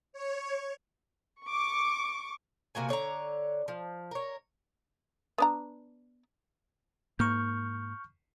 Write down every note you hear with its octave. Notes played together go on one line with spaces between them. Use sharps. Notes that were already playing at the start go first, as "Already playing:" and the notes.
C#5
C#6 D6
C3 A#3 F#4 G#5
D3 C#5 F#5 A#5
F3
A#4 C#5
B3 D4 A#5
G#2 A#3 C#6 F6 G6